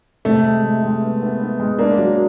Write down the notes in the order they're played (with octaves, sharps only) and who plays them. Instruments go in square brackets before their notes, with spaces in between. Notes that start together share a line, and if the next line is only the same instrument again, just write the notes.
[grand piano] C3 [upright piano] A3
[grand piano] G#3
G#3
G#3
B3
B3
B3
G#3
[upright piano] A#3 [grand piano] D4
[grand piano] F#3